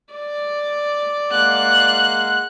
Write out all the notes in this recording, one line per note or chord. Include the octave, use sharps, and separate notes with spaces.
D5
G#3 A#3 F#5 F#6